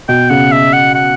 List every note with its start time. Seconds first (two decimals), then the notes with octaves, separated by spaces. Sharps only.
0.09 B2 G5
0.30 C#3 F#5
0.52 E5
0.73 F#5
0.95 F#5